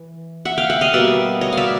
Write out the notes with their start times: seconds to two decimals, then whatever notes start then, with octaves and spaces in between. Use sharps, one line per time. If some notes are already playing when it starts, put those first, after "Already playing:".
Already playing: E3
0.45 E5 F#5
0.58 F5 G5
0.70 E5 F#5
0.81 D#5 F5
0.93 B2 G3 A#3 D5 E5
1.41 C#5 D#5
1.53 D5 E5 F5